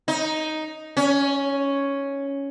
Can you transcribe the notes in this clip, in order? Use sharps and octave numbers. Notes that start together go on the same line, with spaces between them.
D#4
C#4